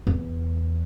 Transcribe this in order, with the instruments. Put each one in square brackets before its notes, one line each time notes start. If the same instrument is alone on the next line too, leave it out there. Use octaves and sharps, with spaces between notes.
[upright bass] E2